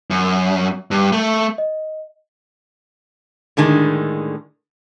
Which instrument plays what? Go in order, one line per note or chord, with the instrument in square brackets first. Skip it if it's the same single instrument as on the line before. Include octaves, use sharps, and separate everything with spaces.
[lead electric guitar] F#2
G2
A3
[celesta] D#5
[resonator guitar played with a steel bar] A2 D3 D#3 G#3